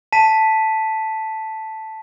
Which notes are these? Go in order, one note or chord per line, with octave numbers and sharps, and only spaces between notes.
A5 B6 D#7